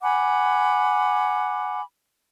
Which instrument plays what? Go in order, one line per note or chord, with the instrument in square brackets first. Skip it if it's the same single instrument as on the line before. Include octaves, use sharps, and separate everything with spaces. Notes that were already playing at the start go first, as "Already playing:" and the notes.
[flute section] F#5 G#5 B5 D6